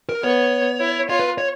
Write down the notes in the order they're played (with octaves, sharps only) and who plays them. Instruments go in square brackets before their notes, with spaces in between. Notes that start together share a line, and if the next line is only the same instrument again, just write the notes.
[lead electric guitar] A#4
[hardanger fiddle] B3 [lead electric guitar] C#5
[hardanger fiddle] E4
[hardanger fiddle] F4 [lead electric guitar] C#5
[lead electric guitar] B4
C#5